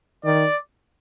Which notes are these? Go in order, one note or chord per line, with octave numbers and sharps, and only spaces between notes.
D#3 D5